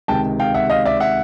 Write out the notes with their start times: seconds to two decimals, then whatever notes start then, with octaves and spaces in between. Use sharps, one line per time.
0.08 C#2 C3 D#3 G5 A5
0.40 F5 G5
0.54 E5 F#5
0.69 D#5 F5
0.85 D5 E5
1.00 E5 F#5